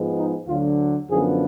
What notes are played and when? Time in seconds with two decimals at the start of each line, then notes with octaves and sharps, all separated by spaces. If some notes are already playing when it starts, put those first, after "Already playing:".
Already playing: G#2 F3 G#3 B3
0.18 D#4
0.47 D2 D3 F#3 F4
1.10 F#2 D3 F3 B3 G#4